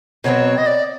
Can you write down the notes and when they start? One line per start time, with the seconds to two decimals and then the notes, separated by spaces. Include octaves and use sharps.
0.24 B2 F#3 A3 C4 C#5
0.58 D#5
0.66 D5